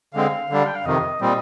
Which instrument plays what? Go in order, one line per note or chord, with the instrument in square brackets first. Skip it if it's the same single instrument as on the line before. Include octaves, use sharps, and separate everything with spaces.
[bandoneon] D3 G#3 C4 [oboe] F5
[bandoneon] D3 G3 D4
[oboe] G5
F5
[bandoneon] F2 C3 D#3 [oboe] D#5
[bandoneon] A#2 G3 C4 [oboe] D#5